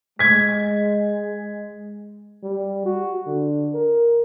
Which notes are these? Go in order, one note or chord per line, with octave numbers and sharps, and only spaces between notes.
G#3 G#6 B6
G3
F#4
D3
A#4